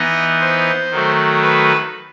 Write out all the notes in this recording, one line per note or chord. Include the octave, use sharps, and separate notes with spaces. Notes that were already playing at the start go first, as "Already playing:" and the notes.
Already playing: E3 B3 D#4 D#5
C5
D#3 F#3 A3
B4